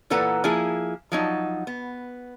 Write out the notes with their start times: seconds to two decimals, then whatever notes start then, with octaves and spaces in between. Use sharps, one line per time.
0.10 A#2 E3 A4 B4 F#5 A#5
0.44 F3 A#3 E4 G#4
1.12 F3 F#3 D#4
1.67 B3